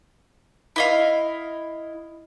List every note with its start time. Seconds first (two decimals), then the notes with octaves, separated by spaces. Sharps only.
0.76 E4 D#5 F5